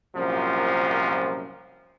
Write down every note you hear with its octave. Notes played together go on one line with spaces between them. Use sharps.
C2 F#2 A#2 F3